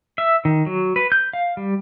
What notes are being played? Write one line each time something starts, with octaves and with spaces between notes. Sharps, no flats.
E5
D#3
F#3
B4
G6
F5
G3